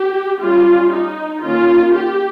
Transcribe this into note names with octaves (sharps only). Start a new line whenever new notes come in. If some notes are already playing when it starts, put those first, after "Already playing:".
Already playing: G4
G3 C#4 F4
D#4
D#3 A#3 C#4 F4
G4